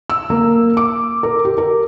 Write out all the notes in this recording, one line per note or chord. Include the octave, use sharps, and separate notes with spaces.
E6
A#3
D6
A#4
G4
A#4